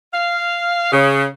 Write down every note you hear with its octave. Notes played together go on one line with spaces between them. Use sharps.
F5
C#3